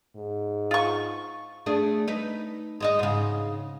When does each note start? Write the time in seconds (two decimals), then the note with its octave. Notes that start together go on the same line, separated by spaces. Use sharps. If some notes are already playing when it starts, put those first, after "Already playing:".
0.16 G#2
0.71 F4 C#6
1.66 A3 D4 G#4
2.08 D#4 B4
2.80 G#3 D#4 D#5
2.99 G#2 C#3